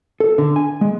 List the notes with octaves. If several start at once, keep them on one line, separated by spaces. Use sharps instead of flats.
A4
D3
G#5
G#3